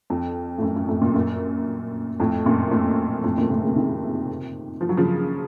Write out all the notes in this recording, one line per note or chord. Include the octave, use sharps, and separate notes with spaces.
F2
A2
F#2
F#2
F2 A2
F#2 A#2
F#2 A#2
F2 A2
F#2 A#2
F2 A2
F2 A2
F#2 A#2
A2 C3
A#2 C#3
C3 D#3
F3
F#3
C#3 F3